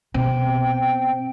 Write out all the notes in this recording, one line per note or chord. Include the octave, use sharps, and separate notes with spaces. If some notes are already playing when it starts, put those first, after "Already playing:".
B2 C4 G5